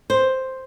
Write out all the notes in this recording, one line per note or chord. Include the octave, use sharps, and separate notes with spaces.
C5